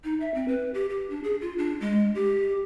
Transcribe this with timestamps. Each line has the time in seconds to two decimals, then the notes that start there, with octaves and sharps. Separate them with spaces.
0.04 D#4
0.20 E5
0.35 C4
0.48 B4
0.74 G4
0.90 G4
1.10 D4
1.24 G#4
1.41 F4
1.58 D4
1.81 G#3
2.15 G4